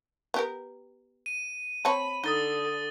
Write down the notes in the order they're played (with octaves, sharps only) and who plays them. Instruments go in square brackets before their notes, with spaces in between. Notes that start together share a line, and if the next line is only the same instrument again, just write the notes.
[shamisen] B3 G4 A#4
[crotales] D#7
[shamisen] C4 C#5 A5 [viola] B5
[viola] D3 [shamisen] D#4 [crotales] D#6 A6 G7